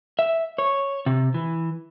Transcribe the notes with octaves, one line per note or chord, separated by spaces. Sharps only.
E5
C#5
C3
E3